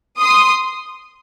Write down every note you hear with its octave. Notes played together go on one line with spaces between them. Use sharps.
C6 D#6